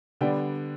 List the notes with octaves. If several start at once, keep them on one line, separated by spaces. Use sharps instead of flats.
D3 G3 B3 D4 G5